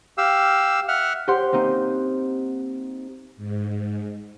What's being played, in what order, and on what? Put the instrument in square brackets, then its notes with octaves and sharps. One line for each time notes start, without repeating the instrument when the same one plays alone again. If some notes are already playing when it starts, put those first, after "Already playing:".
[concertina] G4 F5 E6
E5 F#5 F6
[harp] G4 C5 F#5 C6 F#6
A#3 C4 D#4
[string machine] G#2